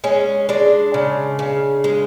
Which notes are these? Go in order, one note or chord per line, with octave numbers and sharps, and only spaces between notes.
G#3 C#4
G#3 D4
C#3
C#3
G#3